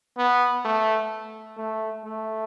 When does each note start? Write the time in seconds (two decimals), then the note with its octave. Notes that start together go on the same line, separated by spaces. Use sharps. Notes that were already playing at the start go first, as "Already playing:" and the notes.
0.17 B3
0.65 A3
1.57 A3
2.04 A3